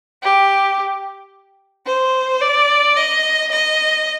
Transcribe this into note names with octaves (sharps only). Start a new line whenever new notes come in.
G4
C5
D5
D#5
D#5